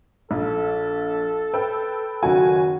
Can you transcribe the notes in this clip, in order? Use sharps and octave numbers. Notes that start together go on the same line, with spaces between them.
A#1 A4
B4 G5 E6
F#1 D#3 F#4 G#5